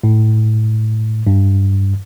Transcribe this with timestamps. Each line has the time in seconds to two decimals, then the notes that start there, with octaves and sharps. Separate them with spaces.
0.04 A2
1.27 G2